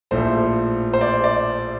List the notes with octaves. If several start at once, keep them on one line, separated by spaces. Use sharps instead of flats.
A#1 A2 F3 A3 E4 C5
C5
D5
D5